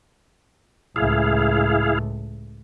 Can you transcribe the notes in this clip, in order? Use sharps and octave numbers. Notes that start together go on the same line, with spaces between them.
C#2 A2 E4 G#4 F5